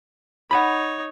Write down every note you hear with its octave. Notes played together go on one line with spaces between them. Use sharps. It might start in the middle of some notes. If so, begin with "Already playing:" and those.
D#4 C#5 F#5 G#5 B5